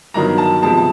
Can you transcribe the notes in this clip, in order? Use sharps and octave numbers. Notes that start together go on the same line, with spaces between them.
G2 D#3 F#3 B3 A#5
A5
C3 F3 G#3 B3 A5
A5